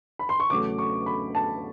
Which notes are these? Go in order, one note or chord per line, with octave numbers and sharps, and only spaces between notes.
B5
C6
C#6
E2 C#3 F#3 A3 D6
C#6
B5
A5